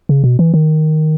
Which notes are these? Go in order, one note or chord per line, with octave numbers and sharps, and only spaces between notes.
C#3
B2
E3
D#3